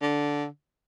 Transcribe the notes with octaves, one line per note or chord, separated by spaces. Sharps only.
D3